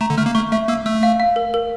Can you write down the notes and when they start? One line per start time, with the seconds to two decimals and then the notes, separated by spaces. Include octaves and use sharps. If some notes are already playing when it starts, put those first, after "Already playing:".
0.01 A3 A#5
0.10 D3
0.18 A3 F6
0.26 A#3
0.35 A3 C#6
0.51 A3 E5
0.68 A#3 E6
0.86 A3 E6
1.03 F5
1.20 F5
1.36 A#4
1.54 A#4